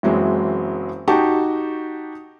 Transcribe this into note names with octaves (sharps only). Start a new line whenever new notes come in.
F#1 E3 F#3 G#3 C4
D#4 F#4 G4 A5 C#6